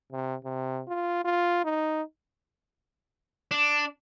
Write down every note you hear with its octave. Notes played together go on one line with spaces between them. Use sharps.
C3
C3
F4
F4
D#4
D4